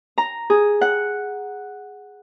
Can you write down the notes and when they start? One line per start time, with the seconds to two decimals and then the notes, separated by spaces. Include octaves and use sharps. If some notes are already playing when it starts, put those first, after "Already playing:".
0.18 A#5
0.50 G#4
0.81 F#5